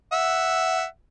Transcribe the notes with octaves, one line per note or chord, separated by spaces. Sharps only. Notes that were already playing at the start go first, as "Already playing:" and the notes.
E5 F#5